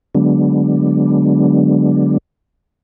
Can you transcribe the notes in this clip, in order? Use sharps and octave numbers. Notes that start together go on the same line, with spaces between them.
D3 F#3 G#3 B3 D4